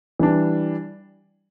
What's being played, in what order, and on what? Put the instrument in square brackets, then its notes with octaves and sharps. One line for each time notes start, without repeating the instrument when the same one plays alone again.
[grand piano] E3 G3 D4